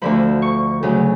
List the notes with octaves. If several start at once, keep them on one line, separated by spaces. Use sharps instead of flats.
D2 D3 F3 B5
C#6
D2 C#3 F#3